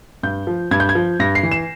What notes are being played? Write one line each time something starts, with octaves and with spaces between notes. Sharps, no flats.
G2 G6
F3
G2 G#6
G6
G#6
F3
G2 A#6
C7
E3
E7